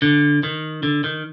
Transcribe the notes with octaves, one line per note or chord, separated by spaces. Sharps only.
D3
D#3
D3
D#3